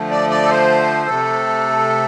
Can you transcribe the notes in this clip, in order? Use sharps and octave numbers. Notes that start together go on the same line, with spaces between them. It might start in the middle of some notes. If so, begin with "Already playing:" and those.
Already playing: D3 F3 A3
D5
D5
A4
C5
C3 A3 A4